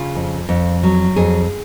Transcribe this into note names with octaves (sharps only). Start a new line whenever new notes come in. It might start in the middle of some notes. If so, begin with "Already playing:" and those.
Already playing: C#3 F4
F2
F2
F#3
F2 G#4